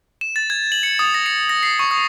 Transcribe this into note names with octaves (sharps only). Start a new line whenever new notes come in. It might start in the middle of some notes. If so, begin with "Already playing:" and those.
E7
A6
G#6
F#7
C#7
D#6
A#6
C#7
A#6
C7
C#6
D#6